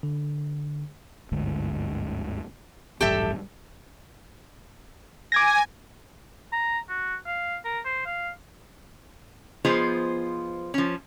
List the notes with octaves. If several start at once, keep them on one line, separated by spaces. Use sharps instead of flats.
D3
G1 D2 G#2
D#1 A1 G2 G4 A4 E5
G#5 D6 G#6 A#6
A#5
F#4
F5
A#4
C5
F5
F3 B3 F4 G#4 C5 D#5
F3 C#4